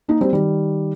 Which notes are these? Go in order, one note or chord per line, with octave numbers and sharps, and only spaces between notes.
A#3 D#4
G3 C4
D#3 G3